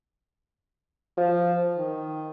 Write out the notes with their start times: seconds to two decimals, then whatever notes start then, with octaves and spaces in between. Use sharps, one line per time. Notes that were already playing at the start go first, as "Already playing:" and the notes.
1.18 F3
1.78 D#3